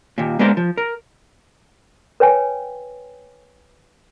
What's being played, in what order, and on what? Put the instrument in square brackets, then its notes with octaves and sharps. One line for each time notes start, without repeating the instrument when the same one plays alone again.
[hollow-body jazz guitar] D#2 A#2
G#3 A#3 B3 D4 A#4 C5
F3
A#4
[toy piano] B4 C#5 G5 G#5